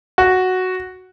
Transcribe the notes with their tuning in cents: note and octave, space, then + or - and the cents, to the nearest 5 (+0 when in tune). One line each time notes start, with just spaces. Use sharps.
F#4 +0